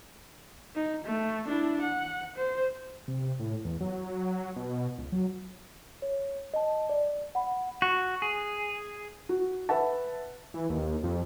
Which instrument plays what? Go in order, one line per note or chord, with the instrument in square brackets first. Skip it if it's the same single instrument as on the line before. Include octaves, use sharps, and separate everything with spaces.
[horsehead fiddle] D#4
A3
D4 E4
F#5
C5
[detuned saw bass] C3
A2
E2
F#3
B2
C#2
F#3
[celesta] C#5
D#5 A5
D5
F#5 B5
[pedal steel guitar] F#4
G#4
[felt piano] F#4
B4 E5 F#5 A5
[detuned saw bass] E3
D#2
F2